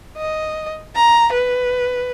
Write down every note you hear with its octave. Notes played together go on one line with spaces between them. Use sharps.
D#5
A#5
B4